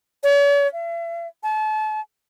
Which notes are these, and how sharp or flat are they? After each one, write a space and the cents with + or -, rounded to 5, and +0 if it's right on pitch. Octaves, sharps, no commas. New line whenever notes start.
C#5 +45
E5 +45
A5 -35